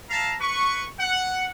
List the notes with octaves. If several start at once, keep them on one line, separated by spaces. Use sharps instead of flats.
E5 F5 A5 A#5
B4 C#6
F#5